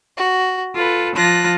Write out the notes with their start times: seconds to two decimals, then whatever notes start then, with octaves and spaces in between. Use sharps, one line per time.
0.17 F#4
0.74 F4 A4 B4
1.15 F3 F4 A5 F#6 A#6